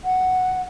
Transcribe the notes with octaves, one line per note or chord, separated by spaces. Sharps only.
F#5